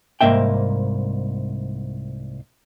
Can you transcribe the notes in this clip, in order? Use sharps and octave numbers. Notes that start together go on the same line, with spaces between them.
C2 G#2 A#3 E5 G5